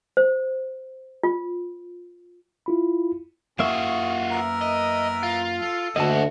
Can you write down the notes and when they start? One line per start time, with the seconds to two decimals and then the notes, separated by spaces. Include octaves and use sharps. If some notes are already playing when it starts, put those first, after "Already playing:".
0.17 C5
1.23 F4
2.66 E4 F4 B5
3.59 F#2 A#3 C#4 F4 F#4 G#4 E5
4.32 B3 E4 A#4
4.61 D#5
5.23 F4
5.57 A4
5.96 D2 A#3 F#4 D#5 A5